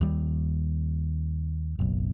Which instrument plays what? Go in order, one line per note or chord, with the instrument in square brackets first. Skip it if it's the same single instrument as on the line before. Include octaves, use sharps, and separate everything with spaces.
[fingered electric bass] D#2 G3
F#1 B1